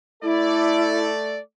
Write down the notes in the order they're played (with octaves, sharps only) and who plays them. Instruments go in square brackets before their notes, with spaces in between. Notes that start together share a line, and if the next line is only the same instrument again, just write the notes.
[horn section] A3 A4 D5 [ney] E4